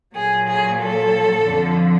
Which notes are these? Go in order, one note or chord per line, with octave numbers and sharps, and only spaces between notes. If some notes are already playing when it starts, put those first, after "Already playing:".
A#2 F#3 G#4
G#4
A4
F2 D3 F3